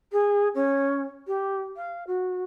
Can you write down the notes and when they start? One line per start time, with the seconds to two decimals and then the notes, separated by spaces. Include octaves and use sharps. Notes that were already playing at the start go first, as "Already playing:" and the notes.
0.12 G#4
0.54 C#4
1.27 G4
1.76 F5
2.07 F#4